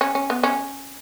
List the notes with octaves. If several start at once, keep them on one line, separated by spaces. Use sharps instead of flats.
C#4
C#4
B3
C#4